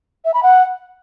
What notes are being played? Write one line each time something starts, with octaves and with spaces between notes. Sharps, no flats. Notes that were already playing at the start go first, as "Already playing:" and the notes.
E5
B5
F#5